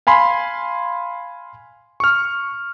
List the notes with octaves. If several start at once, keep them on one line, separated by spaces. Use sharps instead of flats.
F5 G#5 B5 C6
C#6 F6